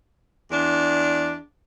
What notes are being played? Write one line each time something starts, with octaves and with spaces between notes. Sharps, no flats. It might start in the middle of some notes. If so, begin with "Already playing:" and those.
E2 D4